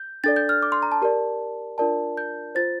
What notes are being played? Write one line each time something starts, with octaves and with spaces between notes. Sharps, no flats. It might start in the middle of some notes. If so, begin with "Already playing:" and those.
Already playing: G6
D4 A4 D5 A6
G6
F6
D6
C6
A#5
A5
G4 A#4 D5
D4 F4 A#4 D5 A5
G6
F4 C5 A6